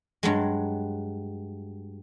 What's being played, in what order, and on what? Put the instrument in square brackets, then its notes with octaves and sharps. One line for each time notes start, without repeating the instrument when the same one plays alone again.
[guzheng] G2 F#3 G#3